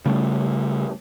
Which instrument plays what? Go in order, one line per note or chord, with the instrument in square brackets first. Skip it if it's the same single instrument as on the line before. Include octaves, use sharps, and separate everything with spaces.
[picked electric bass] C#3 G3 A3